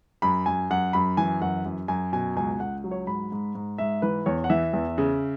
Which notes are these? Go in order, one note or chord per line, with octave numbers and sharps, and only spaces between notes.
F#2 B5
F#2 G#5
F#2 F#5
F#2 B5
E3 G#5
F#2 F#5
F#2
F#2 G#5
B2 G#5
C#2 G#5
C#2 F#5
F#3
C#5
G#2 B5
G#2
G#2
G#2 E5
E3 B4
E2 C#5
F#5
E3 E5
E2
C#3